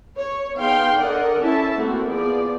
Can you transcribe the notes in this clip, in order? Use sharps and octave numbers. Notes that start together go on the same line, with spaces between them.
C#5
B3 D#4 G#4 F5 G5 C6
D3 A4 A#4 D5 D#5 F#5
C#4 E4 A4 E5 A5
A3 A#3 C4 E4 F#4
F3 B3 G#4 D5